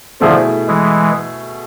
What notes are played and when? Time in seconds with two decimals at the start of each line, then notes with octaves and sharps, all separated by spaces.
0.20 B2 D3 F3 A3 E4 G#4
0.68 E3 G#3